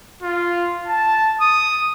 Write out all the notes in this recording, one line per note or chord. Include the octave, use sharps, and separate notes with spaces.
F4
A5
D#6